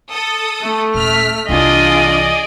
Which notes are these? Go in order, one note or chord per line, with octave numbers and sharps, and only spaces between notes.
A4 D#6
A3
D#1 F6 B6
C2 E3 D4 F4 G#4 D5 D#5